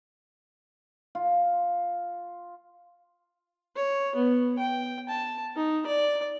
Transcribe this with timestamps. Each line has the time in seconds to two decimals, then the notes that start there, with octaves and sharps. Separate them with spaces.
1.15 F4
3.76 C#5
4.15 B3
4.59 G5
5.09 A5
5.56 D#4
5.86 D5